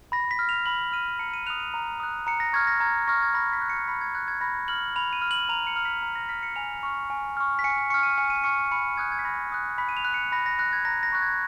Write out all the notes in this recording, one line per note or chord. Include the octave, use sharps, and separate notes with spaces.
B5 A#6
B6
F6
F7
B5 F#7
F6 D#7
A#5 C#7
D#7
D#6 F#6 F7
D#7
A#5
D#6 F#6
A#5 C#7
A#6
C#6 F6 G#6
A#6
A#5 G#6
C#6 F6 A#6
G#6
B5 A#6
B6
F#6
C#7
B5 B6
G#6
F#6 G#6
G#6
B5 A#6
F6 F#7
B5 F7
D#7
F6
F#7
A#5 F7
C#7
F6
B6
A#5
A#6
F6 B6
C#7
G#5 F7
C#6 F6
G#5
C#6 F6
B6
G#5 C#7
C#6 F6 C#7
D#7
G#5 C#7
D#7
C#6 F6 C#7
B5 C#7
D#6 F#6 G#6
G#6
B6
B5 A#6
D#6 F#6
B5 B6
D#7
F7
F#6
C#7
B5 A#6
A#6
F#6 A#6
G#6
A#5 A#6
A#6
C#6 F#6
G#6